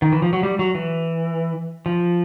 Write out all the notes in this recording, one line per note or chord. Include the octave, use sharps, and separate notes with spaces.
D#3
E3
F3
F#3
G3
F#3
E3
F3